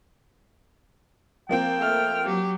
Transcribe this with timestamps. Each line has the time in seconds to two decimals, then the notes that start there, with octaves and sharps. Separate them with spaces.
1.49 F3 A#3 C4 G5
1.79 A3 F6
2.25 F#3 G4